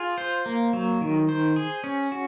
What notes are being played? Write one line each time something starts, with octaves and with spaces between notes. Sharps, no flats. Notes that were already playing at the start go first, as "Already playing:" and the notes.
Already playing: F4 G#4
C5
A#3
F#3
D#3
C5
G#4
C#4
F#4